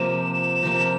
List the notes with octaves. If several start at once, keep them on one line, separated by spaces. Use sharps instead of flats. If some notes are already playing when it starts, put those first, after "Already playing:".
Already playing: C3 F3 A#3 E7
C3 F3 A#3